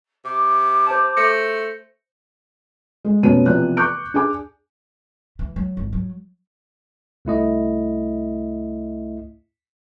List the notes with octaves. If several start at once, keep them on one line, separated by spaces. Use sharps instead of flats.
C3 D6
C5 A5
A3 C5 A#6 C#7
G#3
F1 B2 F#3 C#4 C5 D#7
C3 E3 F3 B3 D5 F#6
C#6 D6 F#6 G6 C#7 D7
D4 G#4 G#5 D6
E3
F#3
G#1
F#3
C2 A3 E4 D#5